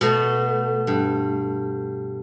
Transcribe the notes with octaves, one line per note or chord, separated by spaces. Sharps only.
B2 A3
G2